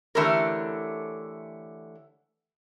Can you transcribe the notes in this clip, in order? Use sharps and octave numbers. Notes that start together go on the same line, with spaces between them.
D3 E3 A3 C#4 G4 A#4